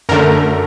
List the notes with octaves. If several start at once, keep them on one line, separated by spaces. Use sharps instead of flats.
F#2 D3 A3 A#4